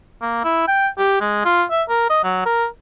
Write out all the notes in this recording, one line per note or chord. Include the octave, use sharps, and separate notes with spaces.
A#3
E4
G5
G4
G#3
F4
E5
A#4
D#5
F#3
A#4